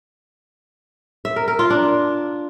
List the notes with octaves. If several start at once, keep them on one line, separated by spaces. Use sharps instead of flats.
E5
A#4
A#4
F4
D4